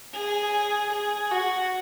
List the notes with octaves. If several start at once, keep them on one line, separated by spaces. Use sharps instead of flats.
G#4
G#4
F#4